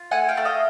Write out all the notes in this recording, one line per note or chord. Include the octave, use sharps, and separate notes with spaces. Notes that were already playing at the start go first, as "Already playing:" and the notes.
Already playing: F4
A3 F#5 G#5
F5 G5
A3
D#5 F5